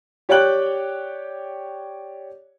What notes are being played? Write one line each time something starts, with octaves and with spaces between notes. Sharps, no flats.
G4 C#5 D5 G5 F#6 F#7